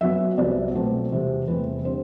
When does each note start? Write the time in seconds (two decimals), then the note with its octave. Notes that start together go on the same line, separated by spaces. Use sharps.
0.01 F#2 F#3 B3 E5
0.38 C2 C3 F#3 B3 D5
0.75 B2 F#3 A3 C4
1.11 E2 C3 G3 C4
1.48 E2 C3 E3 A3 C4 B4
1.85 D3 G3 C4 C5